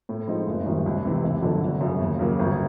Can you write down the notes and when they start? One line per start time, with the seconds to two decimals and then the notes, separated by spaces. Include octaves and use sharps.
0.09 A2
0.28 F3 G#3 C4 D#4
0.47 F#1
0.66 F#2 D#3 G3
0.86 C#2
1.05 C3 E3
1.23 F1
1.42 F2 D3 F#3
1.62 G1
1.81 F#2 C#3
2.00 D#2
2.19 C#3 F#3 A#3
2.39 G1